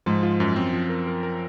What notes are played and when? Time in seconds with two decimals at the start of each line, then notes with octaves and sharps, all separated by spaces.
0.06 G#2 F3
0.23 F4
0.40 F#2
0.56 C4
0.73 F3
0.89 A#4
1.07 A#4
1.23 A#4